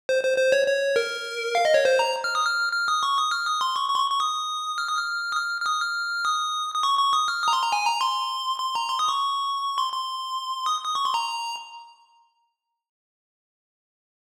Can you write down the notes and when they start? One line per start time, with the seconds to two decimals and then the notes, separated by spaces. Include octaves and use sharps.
0.09 C5
0.23 C5
0.38 C5
0.52 C#5
0.67 C#5
0.96 A#4
1.55 F5
1.65 D#5
1.74 C#5
1.85 C5
1.99 A#5
2.24 F6
2.35 D#6
2.45 F6
2.73 F6
2.88 D#6
3.03 C#6
3.17 D#6
3.31 F6
3.46 D#6
3.61 C6
3.76 C#6
3.90 C#6
3.95 C6
4.00 C#6
4.10 C#6
4.20 D#6
4.78 F6
4.89 D#6
4.97 F6
5.32 D#6
5.36 F6
5.61 F6
5.66 D#6
5.82 F6
6.25 D#6
6.74 D#6
6.83 C#6
6.99 C#6
7.13 D#6
7.28 F6
7.42 D#6
7.48 A#5
7.53 C6
7.62 A#5
7.72 G#5
7.86 A#5
8.01 C6
8.60 C6
8.75 A#5
8.89 C6
8.99 D#6
9.08 C#6
9.78 C6
9.93 C6
10.66 D#6
10.85 D#6
10.95 C#6
11.05 C6
11.14 A#5